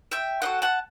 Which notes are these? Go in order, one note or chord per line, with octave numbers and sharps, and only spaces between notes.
E5 G5
C4 D#4 F#4 A4 D#5 F#5
F#5 A5